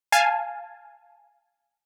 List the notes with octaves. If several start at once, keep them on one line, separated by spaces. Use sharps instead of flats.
F5 G#5 A5